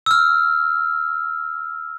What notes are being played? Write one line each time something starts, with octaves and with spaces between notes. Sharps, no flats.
E6 F6